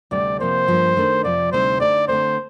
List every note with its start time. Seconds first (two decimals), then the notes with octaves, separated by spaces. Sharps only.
0.11 D2 C3 G3 D5
0.40 C3 F3 A#3 C5
0.68 G2 F3 A#3
0.97 D#3 A3 D4
1.24 F2 C3 F3 D5
1.52 D2 C3 G3 C4 D#4 C5
1.80 D3 A3 D#4 D5
2.09 D3 A3 C4 C5